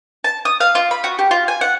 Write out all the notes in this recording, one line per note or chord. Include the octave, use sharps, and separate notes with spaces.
A5
D#6
F5
F4
B5
F#4
G4
F4
G#5
F#5